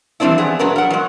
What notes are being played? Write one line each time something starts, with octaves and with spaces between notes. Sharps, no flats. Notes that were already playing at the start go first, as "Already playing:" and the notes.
E3 F3 G3 C4 D4 E4
B3 G#4
A#2 F#3 D4 A#4 B4
A#4 F#5
F#3 G#3